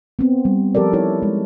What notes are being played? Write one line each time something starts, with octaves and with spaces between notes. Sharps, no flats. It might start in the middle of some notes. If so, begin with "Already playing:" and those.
B3 C4
G3
F3 G4 A4 A#4 D5
D#4 E4 A4 C#5
G#3